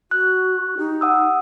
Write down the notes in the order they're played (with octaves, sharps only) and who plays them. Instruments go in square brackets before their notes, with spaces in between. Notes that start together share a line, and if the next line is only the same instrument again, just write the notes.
[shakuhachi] F#4 [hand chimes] F#6
[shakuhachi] D#4 [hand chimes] G4
[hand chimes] F#5 D#6 E6